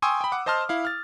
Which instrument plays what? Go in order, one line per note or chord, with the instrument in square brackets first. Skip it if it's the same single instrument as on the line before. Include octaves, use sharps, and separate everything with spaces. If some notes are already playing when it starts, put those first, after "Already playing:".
[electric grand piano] G5 G#5 C6 C#6 D#6 E6
G5 B5
F#5 D6
C5 D#5 A5 C6 F6
E4 F5
F6 A6